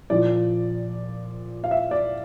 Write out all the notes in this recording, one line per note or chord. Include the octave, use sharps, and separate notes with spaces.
A#2 F3 D5
F5
E5
D5